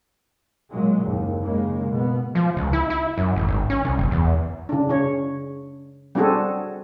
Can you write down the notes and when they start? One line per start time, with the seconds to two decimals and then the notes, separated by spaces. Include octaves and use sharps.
0.69 A#2 F#3 G#3
1.03 F#1 D#2
1.42 G#2 C#3 G#3 A#3
1.91 B2 B3
2.35 F3
2.57 C#2
2.73 E4
2.90 E4
3.18 F#2
3.36 A1
3.48 G#1
3.70 C#4
3.85 C2
3.98 F#1
4.11 E2
4.69 C#3 D4
4.89 C#3 C#5
6.15 G3 C4 D4 F#4 G#4 A4